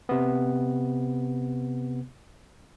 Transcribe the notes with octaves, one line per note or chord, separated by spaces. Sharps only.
C3 B3